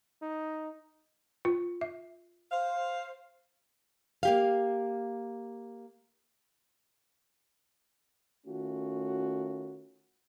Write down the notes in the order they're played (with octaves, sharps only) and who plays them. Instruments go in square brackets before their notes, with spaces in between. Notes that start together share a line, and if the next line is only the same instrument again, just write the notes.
[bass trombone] D#4
[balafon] F4
E5
[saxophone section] C5 F5
[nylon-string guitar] A#3 G4 F5
[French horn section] D#3 A3 C#4 F4 F#4